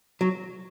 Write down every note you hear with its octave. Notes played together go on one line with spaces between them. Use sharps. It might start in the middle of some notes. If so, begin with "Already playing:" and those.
F#3